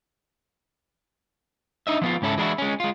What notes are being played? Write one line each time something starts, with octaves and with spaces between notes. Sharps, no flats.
D4 D#4 D#5 E5
F3 B3 F4
C#2 G#2 C#4 E4 A4
E3 G#3 D4 E4 F#4
G#3 C#4
G#3 F4